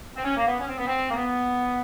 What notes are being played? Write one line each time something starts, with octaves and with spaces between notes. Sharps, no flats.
C4
C#4
A#3
B3
C#4
C4
B3
C4
A#3
B3